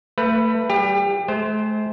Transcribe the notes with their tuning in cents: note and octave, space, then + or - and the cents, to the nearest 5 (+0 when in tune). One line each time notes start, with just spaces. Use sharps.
A3 +30 B4 +0
G3 -20 G4 +35
A3 -45 C5 +5